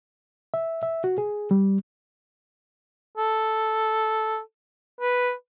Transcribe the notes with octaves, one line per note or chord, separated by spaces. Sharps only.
E5
E5
F#4
G#4
G3
A4
B4